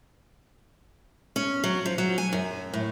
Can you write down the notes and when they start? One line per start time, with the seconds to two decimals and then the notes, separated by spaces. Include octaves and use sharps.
1.36 C#4
1.64 F#3
1.86 F3
1.98 F#3
2.18 G#5
2.33 F#2
2.74 A2